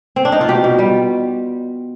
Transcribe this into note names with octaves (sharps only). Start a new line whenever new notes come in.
C4
D4
D#4
F4
B2 G4
B2
G3